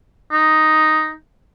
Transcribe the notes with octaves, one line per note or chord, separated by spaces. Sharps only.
D#4